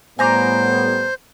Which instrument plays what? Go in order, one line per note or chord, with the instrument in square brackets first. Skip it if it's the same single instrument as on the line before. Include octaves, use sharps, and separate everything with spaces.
[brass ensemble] A2 G3 B3 [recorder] C5 [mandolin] G#5 A#5 D6